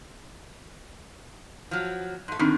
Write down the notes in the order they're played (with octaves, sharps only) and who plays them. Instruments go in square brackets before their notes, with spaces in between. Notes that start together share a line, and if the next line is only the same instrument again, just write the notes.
[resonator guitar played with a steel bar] F3 F#3
G#2 A3
[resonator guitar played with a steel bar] A2 D3 D#3 [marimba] C4 D4 D#4